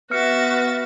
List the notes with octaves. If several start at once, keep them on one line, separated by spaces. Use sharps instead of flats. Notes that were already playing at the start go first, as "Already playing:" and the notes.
B3 F#4 E5 F6 A6 C#7